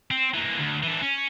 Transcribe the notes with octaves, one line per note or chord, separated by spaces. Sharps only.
C4
E3 A#3
D2
E3 D4
C#4